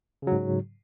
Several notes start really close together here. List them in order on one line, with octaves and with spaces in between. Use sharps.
C#3 F#3 G#2